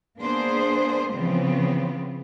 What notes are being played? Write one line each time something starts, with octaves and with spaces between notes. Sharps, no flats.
A#3 B3 D4 G#4 C5
C#3 E3 F3 B3 C4